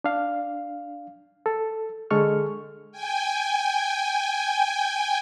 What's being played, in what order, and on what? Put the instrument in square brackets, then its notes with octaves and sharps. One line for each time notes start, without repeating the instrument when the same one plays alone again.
[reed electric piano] D4 F5
A4
D3 G#3 A4 C#6 F6
[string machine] G5 G#5